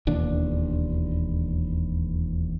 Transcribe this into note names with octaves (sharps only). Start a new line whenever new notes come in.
E1 D#2 D4